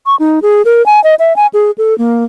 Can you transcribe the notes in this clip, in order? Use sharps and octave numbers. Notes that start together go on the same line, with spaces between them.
C#6
D#4
G#4
A#4
G#5
D#5
E5
G#5
G#4
A4
A#3